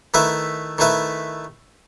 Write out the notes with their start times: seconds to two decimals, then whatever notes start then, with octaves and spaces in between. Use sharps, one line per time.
0.14 D#3 A3 E4 B4 E5
0.78 D#3 A3 E4 B4 E5